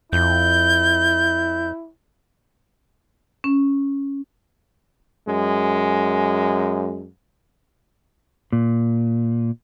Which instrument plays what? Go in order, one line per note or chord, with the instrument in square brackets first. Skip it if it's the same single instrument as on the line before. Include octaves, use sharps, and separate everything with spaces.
[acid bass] F2 [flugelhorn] E4 [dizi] G6
[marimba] C#4
[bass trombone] F#2 [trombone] G#3
[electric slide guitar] A#2